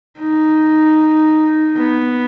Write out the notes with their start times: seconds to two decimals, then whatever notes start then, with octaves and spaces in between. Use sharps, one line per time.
0.19 D#4
1.77 B3